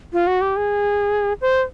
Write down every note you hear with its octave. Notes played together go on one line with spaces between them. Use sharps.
F4
F#4
G4
G#4
C5